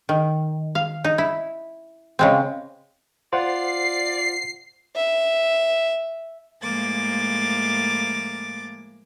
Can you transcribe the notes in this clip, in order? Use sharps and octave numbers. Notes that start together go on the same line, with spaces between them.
D#3
F5
D#4
E4
C#3 G#3 C4
F4 C5 D5 F#5 C7
E5
A2 F3 G#3 A#3 D6 A6